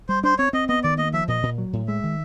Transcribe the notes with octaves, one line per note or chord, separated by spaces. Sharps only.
G3 C5
D4 C5
C4 C#5
C4 D#5
B3 D#5
D#3 D5
A#3 D#5
F3 E5
A#2 D#5
A#2
F#3
A2
G#3 E5
D#3